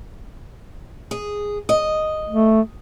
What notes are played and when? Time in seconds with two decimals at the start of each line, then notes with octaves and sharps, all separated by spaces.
1.11 G#4
1.69 D#5
2.29 A3